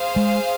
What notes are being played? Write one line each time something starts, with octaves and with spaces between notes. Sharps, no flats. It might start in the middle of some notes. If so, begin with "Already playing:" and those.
Already playing: G#4 C5 F5
G#3